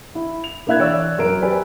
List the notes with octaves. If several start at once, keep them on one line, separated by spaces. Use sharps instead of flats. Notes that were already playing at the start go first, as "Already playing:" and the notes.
E4
F7
A#3 D4 E4 E5 F#6 G#6
E3 C#5 D5 E6
F#2 A#4 D7
G4 B4 C5 D5 G#5